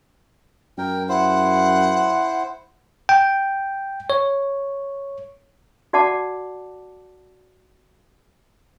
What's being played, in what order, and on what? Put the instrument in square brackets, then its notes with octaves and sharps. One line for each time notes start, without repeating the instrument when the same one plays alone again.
[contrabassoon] F#2 [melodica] A#4 G5
[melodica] E4 C5 [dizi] F#5
[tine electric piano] G5
C#5
[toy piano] F#4 D5 F#5 A5 D6